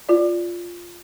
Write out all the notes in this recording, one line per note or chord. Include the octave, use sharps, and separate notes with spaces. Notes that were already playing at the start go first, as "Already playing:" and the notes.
F4 D5